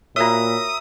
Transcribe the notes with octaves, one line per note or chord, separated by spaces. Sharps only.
A#2 F#4 A#4 C#5 E5 A#5 D#6